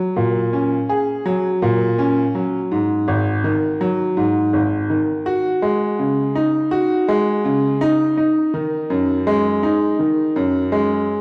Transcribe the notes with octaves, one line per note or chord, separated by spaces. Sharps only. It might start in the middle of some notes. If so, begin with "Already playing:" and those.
Already playing: F#3
A#2
C#4
G#4
F#3
A#2
C#4
F#3
G#2
G#1
D#3
F#3
G#2
G#1
D#3
F#4
G#3
C#3
D#4
F#4
G#3
C#3
D#4
D#4
D#3
F#2
G#3
D#4
D#3
F#2
G#3